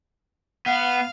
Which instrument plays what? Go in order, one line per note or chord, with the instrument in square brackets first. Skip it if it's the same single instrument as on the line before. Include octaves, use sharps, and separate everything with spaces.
[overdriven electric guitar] B3 [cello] F5 [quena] F#5